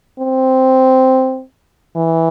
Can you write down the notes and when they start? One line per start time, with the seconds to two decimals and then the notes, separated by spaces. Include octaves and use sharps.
0.19 C4
1.95 E3